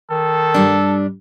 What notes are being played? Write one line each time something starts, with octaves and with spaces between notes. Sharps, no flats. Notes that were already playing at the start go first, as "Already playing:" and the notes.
D#3 A4
G2 G3 D4